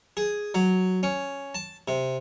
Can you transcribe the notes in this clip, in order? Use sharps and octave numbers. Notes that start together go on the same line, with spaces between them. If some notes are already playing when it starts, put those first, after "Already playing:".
G#4
F#3
C#4
A5
C3